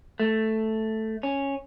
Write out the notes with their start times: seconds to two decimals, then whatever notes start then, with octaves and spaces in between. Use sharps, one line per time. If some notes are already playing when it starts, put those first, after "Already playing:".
0.20 A3
1.23 C#4